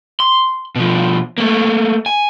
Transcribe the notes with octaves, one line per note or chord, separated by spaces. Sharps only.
C6
B2 F3
A3 A#3
G#5